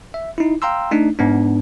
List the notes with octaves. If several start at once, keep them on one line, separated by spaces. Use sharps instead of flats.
E5
D#4 E4
F5 G5 A#5 C6 E6
A3 D4 D#4
G#2 B3 D4